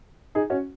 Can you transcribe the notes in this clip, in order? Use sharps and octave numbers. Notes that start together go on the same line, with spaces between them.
D#4 G#4
C#4 F#4